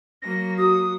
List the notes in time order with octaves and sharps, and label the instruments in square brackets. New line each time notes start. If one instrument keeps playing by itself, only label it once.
[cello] F#3 A#3 [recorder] A#6
[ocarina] F#4 [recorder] D#6